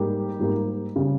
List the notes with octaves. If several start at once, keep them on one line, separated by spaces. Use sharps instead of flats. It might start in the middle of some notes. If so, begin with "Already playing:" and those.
Already playing: G#2 G3 A#3 G4
G#2 G3 A#3
C#3 G3